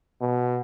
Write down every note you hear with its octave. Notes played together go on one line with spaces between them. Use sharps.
B2